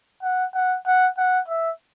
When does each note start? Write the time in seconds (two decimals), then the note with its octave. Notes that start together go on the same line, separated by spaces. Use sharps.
0.23 F#5
0.55 F#5
0.86 F#5
1.18 F#5
1.48 E5